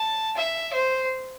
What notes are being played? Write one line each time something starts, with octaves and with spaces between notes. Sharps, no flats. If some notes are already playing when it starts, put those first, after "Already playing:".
Already playing: A5
E5
C5